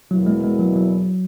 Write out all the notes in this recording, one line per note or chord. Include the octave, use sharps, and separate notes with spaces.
E2 B2 F#3 A#3 E4
G#3
G#3
F#3
F#3